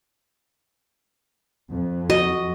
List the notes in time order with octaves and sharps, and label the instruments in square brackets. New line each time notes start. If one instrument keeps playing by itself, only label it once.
[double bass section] F2
[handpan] F#4 [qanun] D#5